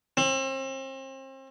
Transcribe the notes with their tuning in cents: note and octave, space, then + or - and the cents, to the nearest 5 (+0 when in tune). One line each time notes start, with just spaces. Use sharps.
C4 +35